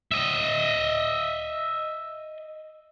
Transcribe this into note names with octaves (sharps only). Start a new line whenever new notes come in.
D#5 E5